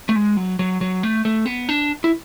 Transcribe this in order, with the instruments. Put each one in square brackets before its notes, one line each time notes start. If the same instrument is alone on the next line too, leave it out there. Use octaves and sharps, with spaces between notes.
[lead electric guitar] A3
G#3
F#3
F#3
F#3
A3
A3
B3
D4
E4